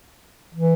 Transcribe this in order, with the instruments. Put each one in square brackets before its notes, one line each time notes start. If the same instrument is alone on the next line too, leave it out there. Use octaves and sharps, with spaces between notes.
[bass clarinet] E3